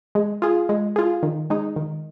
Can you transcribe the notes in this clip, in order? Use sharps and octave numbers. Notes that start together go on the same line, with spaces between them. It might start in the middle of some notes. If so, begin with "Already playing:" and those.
G#3
F4 G#4
G#3
F4 G#4
D#3
G#3 D#4
D#3